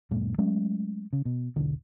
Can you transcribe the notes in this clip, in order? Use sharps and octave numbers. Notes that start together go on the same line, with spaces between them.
D1 F#2 A#2 G#3
F#3 G#3 A3 C#4
C#3
B2
E1 B1 D3